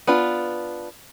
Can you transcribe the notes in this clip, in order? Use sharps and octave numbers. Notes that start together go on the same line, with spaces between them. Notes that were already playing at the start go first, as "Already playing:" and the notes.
B3 D4 F4